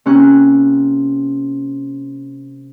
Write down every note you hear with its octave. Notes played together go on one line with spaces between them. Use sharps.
C3 A#3 C#4 F#6